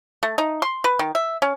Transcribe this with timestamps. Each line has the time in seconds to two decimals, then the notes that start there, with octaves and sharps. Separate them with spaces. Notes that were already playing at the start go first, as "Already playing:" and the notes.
0.23 A3
0.38 D#4
0.62 C6
0.84 B4
0.99 D#3
1.15 E5
1.42 C#4